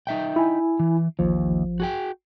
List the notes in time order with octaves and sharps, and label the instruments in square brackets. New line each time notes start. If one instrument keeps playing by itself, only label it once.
[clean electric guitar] D#4 E5 G5
[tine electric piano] E4 G#5
[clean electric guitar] E3
[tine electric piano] A1 F3 [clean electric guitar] D#2
[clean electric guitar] F#4 G#4 G5